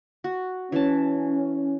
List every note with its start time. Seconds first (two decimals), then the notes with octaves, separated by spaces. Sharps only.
0.24 F#4
0.72 E3 C#4 A5